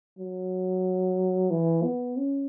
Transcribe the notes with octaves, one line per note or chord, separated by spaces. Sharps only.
F#3
E3
B3
C#4